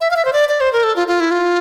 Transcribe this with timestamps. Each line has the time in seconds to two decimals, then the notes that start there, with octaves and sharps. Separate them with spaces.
0.01 E5
0.11 F5
0.16 E5
0.25 C5
0.33 D5
0.49 D5
0.61 C5
0.73 A#4
0.84 A4
0.96 F4
1.08 F4
1.20 E4
1.31 F4